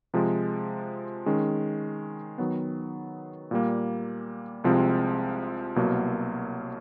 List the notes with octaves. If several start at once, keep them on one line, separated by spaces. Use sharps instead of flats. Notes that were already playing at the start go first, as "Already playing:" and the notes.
C3 F3 G#3
D#3 G#3 C#4
D#3 F#3 B3
A#2 G3 A#3
C2 C3 F3 G#3 C4
C2 B2 F#3 A#3